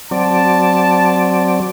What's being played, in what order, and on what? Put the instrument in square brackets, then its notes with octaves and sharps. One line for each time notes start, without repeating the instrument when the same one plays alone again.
[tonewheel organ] F#3 C4 D5 [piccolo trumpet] A5